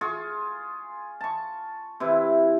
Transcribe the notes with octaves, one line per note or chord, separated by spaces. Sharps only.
F4 G#4 C#6
A5 C#6
C3 E3 E4